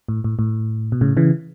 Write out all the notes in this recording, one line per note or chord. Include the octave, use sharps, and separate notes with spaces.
A2
A2
A2
B2
A2 C#3
C#3 E3